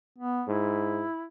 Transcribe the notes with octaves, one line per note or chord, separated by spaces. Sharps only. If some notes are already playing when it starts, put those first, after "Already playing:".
B3
G#2 E4